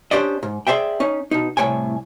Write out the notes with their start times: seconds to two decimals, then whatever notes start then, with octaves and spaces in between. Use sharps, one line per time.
0.11 C#4 D4 G4 C5 D5 D#5
0.43 G#2
0.67 G#4 C5 D5 E5 G5
1.00 C#4 D#4
1.31 B2 D#4
1.57 C2 A2 C#5 G5 G#5